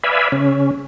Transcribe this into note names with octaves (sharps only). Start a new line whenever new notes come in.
B4 D5 E5 F5 G#5 B5
C#3 C#4